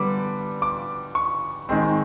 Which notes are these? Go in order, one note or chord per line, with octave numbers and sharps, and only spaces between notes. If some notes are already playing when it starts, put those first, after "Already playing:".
Already playing: D3 G3 B3 D6
D6
C#6
D#3 G#3 C4